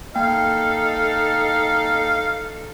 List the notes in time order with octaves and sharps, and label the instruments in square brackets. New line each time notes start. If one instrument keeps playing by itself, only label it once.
[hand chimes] A#3 G5 [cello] D#4 A4 [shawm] F5